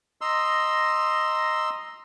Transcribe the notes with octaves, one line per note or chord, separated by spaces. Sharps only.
D#5 A#5 C6 E6